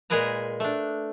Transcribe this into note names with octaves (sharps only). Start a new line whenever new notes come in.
A#2 G#3 G#4 A#4 B4 A#5
A3 D4